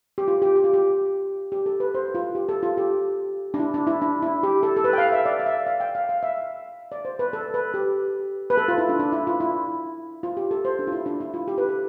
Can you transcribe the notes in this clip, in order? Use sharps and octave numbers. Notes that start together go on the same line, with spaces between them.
G4
F4
G4
G4
F4
G4
G4
A4
B4
C5
F4
G4
A4
F4
G4
D4
E4
D4
E4
D4
E4
G4
A4
A4
B4
G5
F5
E5
D5
F5
E5
F5
G5
F5
F5
E5
D5
C5
B4
A4
B4
G4
B4
A4
F4
E4
D4
D4
E4
F4
E4
F4
G4
A4
C5
D4
F4
E4
D4
E4
F4
G4
B4
A4